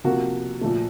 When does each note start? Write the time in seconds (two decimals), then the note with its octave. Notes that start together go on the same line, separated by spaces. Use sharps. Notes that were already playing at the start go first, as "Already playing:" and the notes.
0.04 C3 F3 A#3 F#4
0.61 A#2 F3 A3